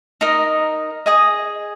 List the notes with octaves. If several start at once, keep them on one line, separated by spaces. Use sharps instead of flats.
D#4 A#4 D#5
G#4 D#5 G#5 D#6